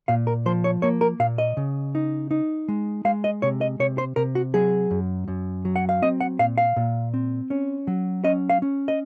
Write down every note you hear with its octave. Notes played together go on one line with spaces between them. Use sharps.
A#2 F5
A#4
F3 C5
C#5
A#3 C#5
A#4
A#2 F5
D#5
C#3
D#4
D#4
G#3
G#3 F5
D#5
C3 C#5
D#5
C3 C#5
C5
C3 A#4
F#4
F#3 G#4
F#2
F#2
F#3
F#5
F5
C4 D#5
F#5
A#2 F5
F5
A#2
C4
C#4
F#3
C#4 D#5
F5
C#4
D#5